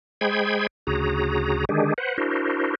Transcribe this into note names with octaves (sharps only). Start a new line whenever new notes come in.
G#3 G#4 C5 G5 B5 G#6
D2 C#3 F#4 G#4 A#5
D3 D#3 G#3 D4 G4 G#4
B4 C5 F#5
D4 E4 F#4 A#4 C5